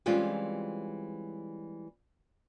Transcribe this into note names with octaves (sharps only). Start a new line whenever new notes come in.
E3 G3 G#3 C4 C#4 F4